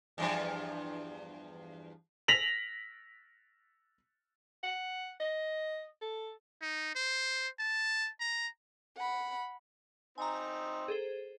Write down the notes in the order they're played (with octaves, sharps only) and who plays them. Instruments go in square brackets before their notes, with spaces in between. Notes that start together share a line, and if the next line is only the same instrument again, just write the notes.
[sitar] E2 G2 F3
[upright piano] A#6 B6 F7 F#7
[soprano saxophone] F#5
D#5
A4
[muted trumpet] D#4
C5
A5
A#5
[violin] F#5 B5
[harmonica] C4 D#4 [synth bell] G#5 A#5
[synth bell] G#4 A4 C5